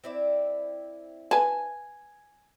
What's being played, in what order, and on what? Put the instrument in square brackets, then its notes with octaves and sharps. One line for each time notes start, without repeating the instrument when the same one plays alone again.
[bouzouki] C4 E4 D5
[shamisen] B4 A5 [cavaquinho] G#5